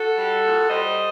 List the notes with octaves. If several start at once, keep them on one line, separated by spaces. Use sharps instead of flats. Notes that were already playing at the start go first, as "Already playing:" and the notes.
Already playing: F#4 A4
G3
A#2
G3 C5 D#5